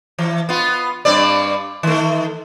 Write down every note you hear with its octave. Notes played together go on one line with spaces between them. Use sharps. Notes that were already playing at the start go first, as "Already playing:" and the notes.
E3
B3 F4
G2 C4 D5
D#3 A3